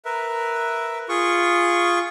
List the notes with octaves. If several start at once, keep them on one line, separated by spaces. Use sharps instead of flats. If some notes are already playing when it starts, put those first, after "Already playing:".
A#4 B4 E5
F4 G#4 C#6